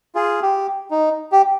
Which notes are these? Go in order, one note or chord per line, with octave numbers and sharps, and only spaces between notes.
F4 G#4
G4
D#4
G4